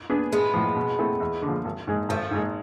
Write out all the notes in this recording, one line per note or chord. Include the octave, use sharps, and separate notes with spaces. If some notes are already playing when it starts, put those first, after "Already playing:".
B3 D4 G#4 B4
A1 G#3 B3
A2 F3
B2
A3 C4 E4 A4
E2
D3
F3
G#1
G#2 G#3
G#1 F3 A3
G#2 G#3